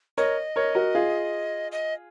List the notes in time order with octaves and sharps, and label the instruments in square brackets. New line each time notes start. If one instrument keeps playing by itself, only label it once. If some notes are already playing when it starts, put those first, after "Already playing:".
[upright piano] A#4 C#5 [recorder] D#5
[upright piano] A#4 C#5
F#4 A#4
F4 G#4
[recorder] D#5